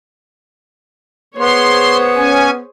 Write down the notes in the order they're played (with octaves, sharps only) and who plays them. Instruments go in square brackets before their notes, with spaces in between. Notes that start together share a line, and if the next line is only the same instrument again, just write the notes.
[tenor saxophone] B3 [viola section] G#4 C5 C#5 [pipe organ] C6
[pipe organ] C#4 G#5